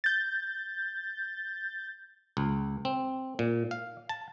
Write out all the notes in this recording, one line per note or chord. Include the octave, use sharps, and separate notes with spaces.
G6 A6
C#2
C4
A#2
F5
A5